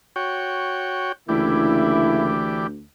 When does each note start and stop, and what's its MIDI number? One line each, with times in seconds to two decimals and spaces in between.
0.16 1.12 66
0.16 1.12 73
0.16 1.12 79
1.29 2.83 38
1.29 2.34 49
1.29 2.67 52
1.29 2.34 58
1.29 2.67 62
1.29 2.34 64
1.29 2.67 67